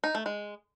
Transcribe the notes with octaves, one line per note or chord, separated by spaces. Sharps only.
D#4
A3
G#3